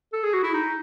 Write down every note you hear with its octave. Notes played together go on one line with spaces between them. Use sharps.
A4
G#4
F#4
E4
D#4